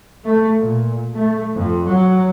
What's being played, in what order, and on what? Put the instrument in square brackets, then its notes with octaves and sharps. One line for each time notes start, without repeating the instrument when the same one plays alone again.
[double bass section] A3
A#2
A3
F2
F#3